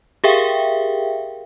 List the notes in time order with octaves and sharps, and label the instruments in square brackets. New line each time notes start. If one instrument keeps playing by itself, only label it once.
[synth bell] G4 G#4 A#4 E5 F5 G5